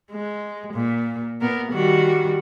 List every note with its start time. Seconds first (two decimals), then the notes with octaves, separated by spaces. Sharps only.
0.12 G#3
0.74 A#2
1.41 A#2 B3 A#4
1.71 D#3 G3 F#4